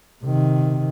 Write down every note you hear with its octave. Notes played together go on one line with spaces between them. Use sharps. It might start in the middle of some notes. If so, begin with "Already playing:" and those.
C3 D#3